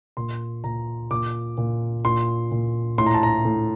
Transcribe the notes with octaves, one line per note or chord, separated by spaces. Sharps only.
A#2 C6
A#2 A#5
A#2 D6
A#2
A#2 C6
A#2
A2 C6
A#5
A5
A#5
A2